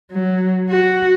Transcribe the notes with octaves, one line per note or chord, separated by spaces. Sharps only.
F#3
F#4